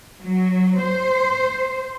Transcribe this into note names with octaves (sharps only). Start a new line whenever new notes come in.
F#3
C5